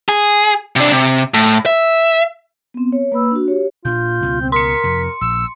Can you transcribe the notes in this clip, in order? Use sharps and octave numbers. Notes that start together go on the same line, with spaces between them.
G#4
C3 D4
C3
A2
E5
B3 C4
C#5
A#3 B4 B5 E6
D4 F#4
G4 C#5
A#2 D4 F4 G6
C#2 B2 C#4
C4
A#4 C6 B6 C#7
F2 C3
A#1 E6